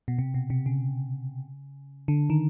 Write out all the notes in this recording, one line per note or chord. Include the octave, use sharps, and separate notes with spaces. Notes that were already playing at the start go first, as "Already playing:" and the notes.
B2
C3
B2
C3
C#3
D3
D#3